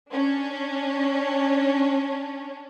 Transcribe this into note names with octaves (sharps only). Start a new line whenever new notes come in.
C#4 D4